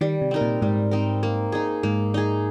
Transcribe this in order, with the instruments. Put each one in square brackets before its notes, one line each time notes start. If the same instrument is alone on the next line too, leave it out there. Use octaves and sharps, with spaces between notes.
[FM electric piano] D#3 [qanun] G3
[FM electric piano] C3
[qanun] C4 D#4 A#4
[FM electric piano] A#2
[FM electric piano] G#2 [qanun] G3
[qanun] C4 D#4 A#4
A#3
D#4 G#4
[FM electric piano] G#2 [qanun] A#3
[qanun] D#4 G#4